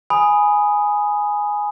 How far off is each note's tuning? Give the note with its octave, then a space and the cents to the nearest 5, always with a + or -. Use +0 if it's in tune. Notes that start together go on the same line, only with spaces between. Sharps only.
G#5 +0 B5 +0 D#6 +0